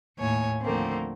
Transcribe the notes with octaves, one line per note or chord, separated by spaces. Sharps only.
D#2 A2 C#5 G#5
D#2 D3 F3 A3 A#3 C4